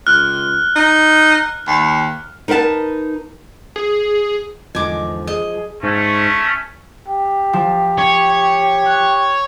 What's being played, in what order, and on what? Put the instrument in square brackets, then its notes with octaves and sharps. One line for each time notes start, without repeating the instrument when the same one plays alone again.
[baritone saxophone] C#2 [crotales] F6 F#6
[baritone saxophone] D#4
D#2
[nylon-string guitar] D#4 A#4 B4 F5 A5
[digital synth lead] G#4
[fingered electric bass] E2 G#2 D3 [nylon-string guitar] F3 [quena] D#5 [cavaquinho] G#5 D6
[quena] G#4 [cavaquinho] D#5
[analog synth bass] G#2 [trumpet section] A3 C#4
[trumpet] G4
[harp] F3
[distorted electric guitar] C#5
[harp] F#6